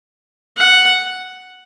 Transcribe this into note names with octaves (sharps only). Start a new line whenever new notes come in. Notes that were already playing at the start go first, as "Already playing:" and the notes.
F#5